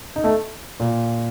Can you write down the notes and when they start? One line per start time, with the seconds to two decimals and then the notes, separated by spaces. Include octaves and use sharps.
0.16 D#4
0.24 A3
0.80 A#2